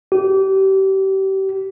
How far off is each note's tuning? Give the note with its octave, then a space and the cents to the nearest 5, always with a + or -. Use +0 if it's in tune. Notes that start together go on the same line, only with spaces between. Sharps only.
G4 -30